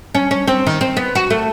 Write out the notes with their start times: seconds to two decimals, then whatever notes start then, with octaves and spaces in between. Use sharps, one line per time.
0.15 C#4
0.31 C#4
0.47 C4
0.67 D#3
0.81 C4
0.97 B3
1.15 F#4
1.30 A3